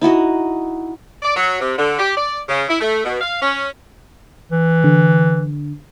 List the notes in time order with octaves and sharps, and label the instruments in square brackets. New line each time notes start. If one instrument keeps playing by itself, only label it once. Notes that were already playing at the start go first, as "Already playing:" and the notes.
[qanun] D#4 E4 F#4 D#5
[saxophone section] D5
F#3
C3
D3
G4
D5
C#3
E4
A3
B2
F5
C#4
[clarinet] E3
[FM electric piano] D3